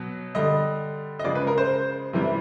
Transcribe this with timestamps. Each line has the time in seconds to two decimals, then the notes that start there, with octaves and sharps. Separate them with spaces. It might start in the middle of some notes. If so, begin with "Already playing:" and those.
Already playing: B2 F#3
0.35 D3 G3 D#5
1.19 D#5
1.24 C#3 F3 G#3 D5
1.35 B4
1.47 A#4
1.58 C5
2.13 C3 E3 G3